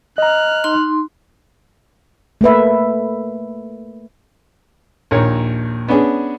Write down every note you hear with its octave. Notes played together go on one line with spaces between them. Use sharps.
D#5 A#5 F6 F#6
D#4 C6
A3 A#3 B4 E5
A#1 D#2 A#4 C#5
B3 C#4 D4 G#4